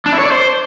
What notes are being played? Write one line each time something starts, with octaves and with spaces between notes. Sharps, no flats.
D4
E4
C#5
D5
C5